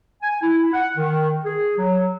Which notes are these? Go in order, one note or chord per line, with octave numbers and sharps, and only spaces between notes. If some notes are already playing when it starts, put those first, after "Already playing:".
G#5
E4
F#5
D#3
G#4
F#3